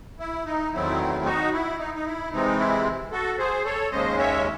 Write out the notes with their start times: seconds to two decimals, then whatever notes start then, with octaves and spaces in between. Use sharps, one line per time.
0.20 E4
0.46 D#4
0.72 E2 D#3 F#3 A3 C4 E4
0.95 D#4
0.99 E4
1.25 D#4 F#4
1.53 E4
1.79 D#4
1.94 D#4
2.05 E4
2.32 C3 E3 G#3 C4 D#4
2.58 E4
3.12 F#4 A4
3.38 G#4 C5
3.65 A4 C#5
3.91 D#2 C#3 G#3 C#4 C5 D#5
4.18 C#5 E5